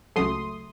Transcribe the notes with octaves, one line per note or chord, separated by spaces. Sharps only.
C#2 C#3 F#3 A3 C6 D#6